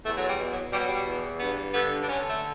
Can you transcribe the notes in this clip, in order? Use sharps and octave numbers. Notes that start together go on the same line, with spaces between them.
E2 A3
F#3
G3
B2
F#3
B2 G3
F#3
G3
E2
G2 B3
D3 B3
D4
D3 C#4
A3